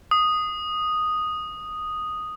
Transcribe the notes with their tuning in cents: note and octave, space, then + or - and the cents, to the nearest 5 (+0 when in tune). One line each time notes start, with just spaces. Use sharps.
D#6 -5